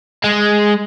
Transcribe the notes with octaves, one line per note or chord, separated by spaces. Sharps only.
G#3